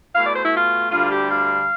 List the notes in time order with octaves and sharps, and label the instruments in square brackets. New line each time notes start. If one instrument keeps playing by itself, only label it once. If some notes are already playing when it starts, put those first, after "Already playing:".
[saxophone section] B2 A3 E4 F5
D5
C5
E4
F4
D2 D3 G3 D4 F4
G4
F5